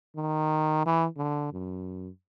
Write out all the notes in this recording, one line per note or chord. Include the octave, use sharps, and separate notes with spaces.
D#3
E3
D3
F#2